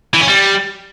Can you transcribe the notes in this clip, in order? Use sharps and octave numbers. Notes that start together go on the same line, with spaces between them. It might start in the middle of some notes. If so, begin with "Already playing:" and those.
E3
C#4
G3